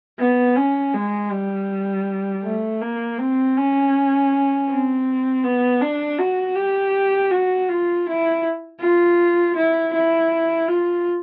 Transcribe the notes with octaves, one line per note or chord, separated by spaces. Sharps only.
B3
C#4
G#3
G3
A3
A#3
C4
C#4
C4
B3
D4
F#4
G4
F#4
F4
E4
F4
E4
E4
F4